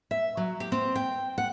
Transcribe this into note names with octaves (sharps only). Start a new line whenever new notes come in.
E5
F#3
G4
C4
G5
F#5